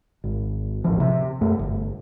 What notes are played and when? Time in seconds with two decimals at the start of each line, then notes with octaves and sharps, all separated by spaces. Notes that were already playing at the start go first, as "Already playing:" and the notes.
0.24 G#1
0.84 D#1 A1 F3
1.00 C3
1.41 F#2 A3
1.59 G1